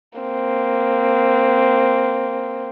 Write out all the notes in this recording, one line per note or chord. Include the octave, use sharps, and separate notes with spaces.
A#3 C4